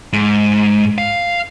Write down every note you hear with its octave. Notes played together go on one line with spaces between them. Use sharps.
G#2
F5